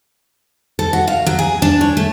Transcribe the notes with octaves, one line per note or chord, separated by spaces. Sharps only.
A4
F#4
F5
F#3
G#4
D4
C#5
A3